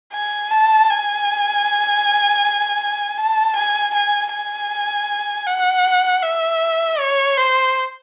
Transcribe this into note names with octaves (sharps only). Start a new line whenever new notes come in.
G#5
A5
G#5
A5
G#5
G#5
G#5
F#5
E5
C#5
C5